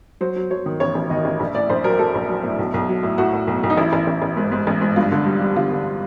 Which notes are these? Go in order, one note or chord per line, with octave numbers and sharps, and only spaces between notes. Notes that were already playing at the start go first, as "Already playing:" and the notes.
F#3 C5
F#3
F#3 C#5
D#3
A1 C#5
A1
D#3 D#5
A1
A#1
A2 D5
A#1 C5
F#3 A#4
F#3 A4
A#1
F#3
A2
B1
B1
F#3
A2
A2 F#4
A2
B1
B1
D#4
A1 E4
A1
A1
A1
G#2
G#2
A1
G#2
G2 F4
D3
G3
G3
D3 F4
D3